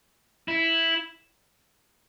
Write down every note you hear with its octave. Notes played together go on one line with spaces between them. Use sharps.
E4